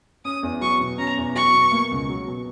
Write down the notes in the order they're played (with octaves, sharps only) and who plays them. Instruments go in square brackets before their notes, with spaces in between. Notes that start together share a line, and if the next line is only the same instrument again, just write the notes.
[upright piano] C#4 [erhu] D#6
[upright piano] E2
[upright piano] F#3 [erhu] C#6
[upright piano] B2
[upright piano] C#4 [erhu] A#5
[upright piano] E2
[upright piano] F#3 [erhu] C#6
[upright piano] B2
A#3
C#2
F#3
B2